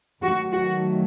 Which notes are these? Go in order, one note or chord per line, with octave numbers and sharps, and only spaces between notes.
D#3 F#3 A3 F#4
F#4